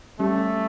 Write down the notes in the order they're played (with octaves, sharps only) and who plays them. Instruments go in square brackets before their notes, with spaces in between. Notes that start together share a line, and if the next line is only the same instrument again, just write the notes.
[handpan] G3 C#4 G4 [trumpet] A3